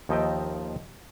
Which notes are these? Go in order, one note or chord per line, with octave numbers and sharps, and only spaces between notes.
D#2 F3 D#4 D#5 E5 G5